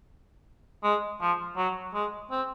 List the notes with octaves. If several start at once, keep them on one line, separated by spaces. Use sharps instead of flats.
G#3
F3
F#3
G#3
C4